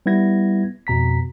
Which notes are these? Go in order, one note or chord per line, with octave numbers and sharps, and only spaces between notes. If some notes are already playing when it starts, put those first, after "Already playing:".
G3 B3 E4 G#6 A#6
F2 B2 A#5 B6